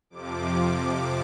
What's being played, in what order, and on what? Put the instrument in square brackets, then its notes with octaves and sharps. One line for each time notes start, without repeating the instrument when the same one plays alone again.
[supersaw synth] F2 C3 F3 D6